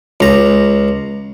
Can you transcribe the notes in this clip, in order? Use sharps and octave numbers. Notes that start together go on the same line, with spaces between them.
C#2 A#5